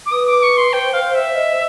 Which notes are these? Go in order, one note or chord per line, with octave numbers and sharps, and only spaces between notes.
D6
B4 D#6
D6
C#6
C6
C5 G5
F5
E5
D#5